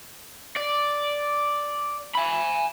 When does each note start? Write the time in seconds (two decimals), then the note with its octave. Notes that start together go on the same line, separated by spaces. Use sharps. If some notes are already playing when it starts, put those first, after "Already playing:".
0.57 D5
2.15 G#5 B5